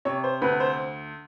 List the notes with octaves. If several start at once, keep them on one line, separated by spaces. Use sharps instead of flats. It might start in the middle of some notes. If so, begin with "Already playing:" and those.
C3 C#5
C5
D2 B4
C5